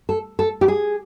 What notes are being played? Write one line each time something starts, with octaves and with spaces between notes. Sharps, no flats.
A4
A4
G4
G#4